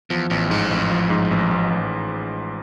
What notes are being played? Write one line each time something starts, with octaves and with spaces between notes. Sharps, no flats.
E2 F3
A1 E2
F2 G#2
A1
F3
G#2
A1
A1
A1